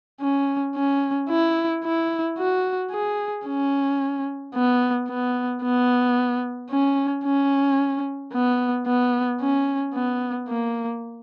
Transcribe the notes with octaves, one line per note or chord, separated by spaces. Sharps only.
C#4
C#4
E4
E4
F#4
G#4
C#4
B3
B3
B3
C#4
C#4
B3
B3
C#4
B3
A#3